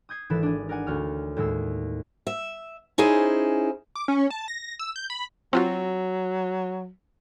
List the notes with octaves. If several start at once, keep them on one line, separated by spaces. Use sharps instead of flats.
D#6 G6 G#6 C7
G#1 E3 A4 B4 E7
D4 G#4
A#4 D5 F#5 G#5
D2 F#4 C#5 F6
D#2 A2 G#3 E6 C7
E5
C#4 D#4 E4 G#4 C5
D6
C#4
A5
A#6
E6
G6
B5
F#3 C4 F4 F#4